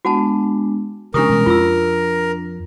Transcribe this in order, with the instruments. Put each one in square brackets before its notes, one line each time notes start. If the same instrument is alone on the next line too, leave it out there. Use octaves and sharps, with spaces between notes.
[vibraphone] G#3 B3 D4 [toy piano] F#4 F#5 A5
[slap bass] C#3 F3 [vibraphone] G#3 C#4 [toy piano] D4 G4 D#6 [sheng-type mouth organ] A#4
[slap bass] B2 E3 G3
[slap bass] F2 [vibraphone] D4 [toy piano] F4 E6